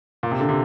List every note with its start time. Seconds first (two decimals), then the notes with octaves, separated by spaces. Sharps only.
0.23 A#2
0.31 C3
0.40 D3
0.49 C3